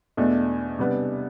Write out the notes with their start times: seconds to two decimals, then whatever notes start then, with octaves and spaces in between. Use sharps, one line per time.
0.17 E2 B2 A3 D4
0.78 C3 G3 B3 D4